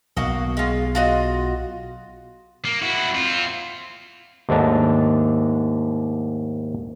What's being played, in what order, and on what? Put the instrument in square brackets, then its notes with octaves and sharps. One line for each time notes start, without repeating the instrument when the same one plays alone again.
[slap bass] B1 [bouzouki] A#3 F#4 D#5
[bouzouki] G#3 F4
F4 F#4 D#5
[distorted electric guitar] A#3
E4 F#4
C4 F4
[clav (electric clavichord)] D#2 G#2 A3 D4 A5 A#5